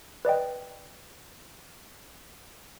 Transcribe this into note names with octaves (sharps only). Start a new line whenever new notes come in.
B4 D5 D#5 G5